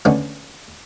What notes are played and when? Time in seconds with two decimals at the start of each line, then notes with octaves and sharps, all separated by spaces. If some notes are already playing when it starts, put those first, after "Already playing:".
0.05 D3 G#3 A3 B3 C#4 D4